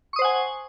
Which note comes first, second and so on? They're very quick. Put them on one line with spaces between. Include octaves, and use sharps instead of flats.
C#6 D#6 C5 F#5 G#5